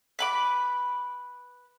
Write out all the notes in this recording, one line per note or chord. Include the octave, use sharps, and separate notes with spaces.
B4 B5 D6